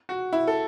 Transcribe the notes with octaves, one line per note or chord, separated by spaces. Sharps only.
F#4
E4
A4